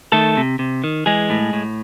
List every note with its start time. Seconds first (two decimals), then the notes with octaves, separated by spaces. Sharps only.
0.12 D#3 A3 A4
0.37 C3
0.59 C3
0.84 D#3
1.06 E3 G#3 G#4
1.30 A2
1.53 A2